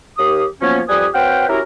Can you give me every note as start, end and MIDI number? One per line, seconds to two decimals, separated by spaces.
0.19 0.45 39
0.19 0.45 67
0.19 0.45 87
0.62 0.80 53
0.62 0.80 54
0.62 0.80 58
0.62 0.80 59
0.62 0.80 61
0.89 1.07 41
0.89 1.07 55
0.89 1.07 67
0.89 1.07 71
0.89 1.07 80
0.89 1.07 87
1.14 1.47 60
1.14 1.47 66
1.14 1.47 71
1.14 1.47 73
1.14 1.47 77
1.14 1.47 79
1.49 1.60 61
1.49 1.60 64
1.49 1.60 66
1.49 1.60 67
1.49 1.60 70